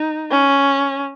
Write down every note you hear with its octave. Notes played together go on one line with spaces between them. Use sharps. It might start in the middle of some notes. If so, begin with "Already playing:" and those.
Already playing: D#4
C#4